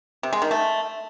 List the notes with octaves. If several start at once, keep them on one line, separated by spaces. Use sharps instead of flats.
C3
G#3
D#3
A3